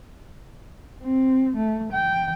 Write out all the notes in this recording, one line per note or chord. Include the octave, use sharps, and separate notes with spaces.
C4
A3
G5